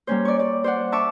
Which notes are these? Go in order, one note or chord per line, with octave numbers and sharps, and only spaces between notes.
G3 A#3 C#4 C5
D5 C#6
D5
C5 D5 F#5
E5 A5 C#6 D6